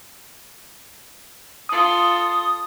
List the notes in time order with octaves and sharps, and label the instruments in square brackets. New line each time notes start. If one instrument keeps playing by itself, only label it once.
[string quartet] F4 A4 [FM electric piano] D#6